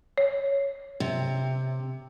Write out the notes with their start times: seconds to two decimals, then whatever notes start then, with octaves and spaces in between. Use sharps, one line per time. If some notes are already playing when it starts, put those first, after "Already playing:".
0.18 C#5
1.00 C3